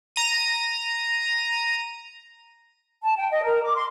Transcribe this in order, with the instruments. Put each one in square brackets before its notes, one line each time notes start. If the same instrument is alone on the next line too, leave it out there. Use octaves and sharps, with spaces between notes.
[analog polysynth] A#5 D#7
[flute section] A5
G5
D#5
A#4
D6
C6